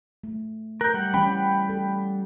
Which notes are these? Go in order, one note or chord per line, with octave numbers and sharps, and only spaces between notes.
A3
A#4 F#6 G6
G3 F#5
E3 C#4 G5 B5
A4